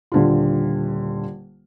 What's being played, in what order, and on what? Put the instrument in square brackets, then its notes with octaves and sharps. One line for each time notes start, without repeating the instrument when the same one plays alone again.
[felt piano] D#1 D3 F4